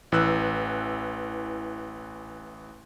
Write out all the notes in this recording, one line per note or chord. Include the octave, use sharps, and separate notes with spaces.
A1 E3 B4 E6 F#6